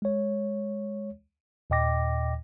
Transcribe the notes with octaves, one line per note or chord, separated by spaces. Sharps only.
G#3 C#5
D#2 A#2 D#5 G5 D6 A#6